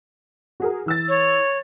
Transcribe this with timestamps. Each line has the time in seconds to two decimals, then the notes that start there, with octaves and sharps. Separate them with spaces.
0.60 F#4 G#4 A#4
0.86 E3 E6 A6
1.09 C#5